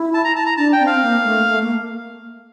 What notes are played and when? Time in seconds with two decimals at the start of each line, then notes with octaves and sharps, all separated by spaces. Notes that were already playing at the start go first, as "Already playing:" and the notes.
Already playing: E4
0.14 A5
0.24 A#5
0.36 A5
0.46 A#5
0.57 D4 A5
0.73 G5
0.80 C4
0.87 F5
1.02 A#3
1.24 A3
1.46 A3
1.61 A#3